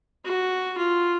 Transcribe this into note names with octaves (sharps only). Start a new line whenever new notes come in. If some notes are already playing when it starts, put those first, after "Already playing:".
F#4
F4